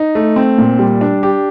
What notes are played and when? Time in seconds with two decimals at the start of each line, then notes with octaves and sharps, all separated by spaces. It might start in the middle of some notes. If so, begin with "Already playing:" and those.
Already playing: D#4
0.15 A3
0.36 C4
0.58 A#2
0.79 G3
1.01 D4
1.23 G4